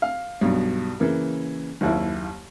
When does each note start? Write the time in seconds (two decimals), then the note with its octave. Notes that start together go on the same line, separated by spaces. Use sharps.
0.02 F5
0.41 B1 G2 B2
1.00 C#3 E3 A#3
1.81 F#1 D#2 E4